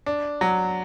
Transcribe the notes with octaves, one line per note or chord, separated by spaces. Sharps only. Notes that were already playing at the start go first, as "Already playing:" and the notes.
D4
F#3